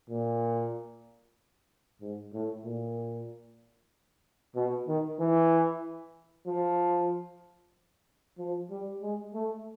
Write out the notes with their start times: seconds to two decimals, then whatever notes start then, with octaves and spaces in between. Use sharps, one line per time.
0.10 A#2
2.01 G#2
2.33 A2
2.65 A#2
4.56 B2
4.88 D#3
5.20 E3
6.47 F3
8.39 F3
8.70 G3
9.02 G#3
9.34 A3